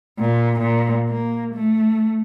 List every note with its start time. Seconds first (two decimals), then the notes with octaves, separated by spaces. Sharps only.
0.19 A#2
0.60 A#2
1.10 A#3
1.55 A3